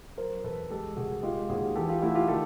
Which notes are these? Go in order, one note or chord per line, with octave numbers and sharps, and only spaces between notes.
F#3 A#4 C5
E2 A4 B4
G#3 G4 A4
C2 F#4 G#4
G#3 F4 G4
D#2 F#4 G#4
E3 G4 A4
F4 G4
A3 E4 F#4
F4 G4
D#3 G4 A4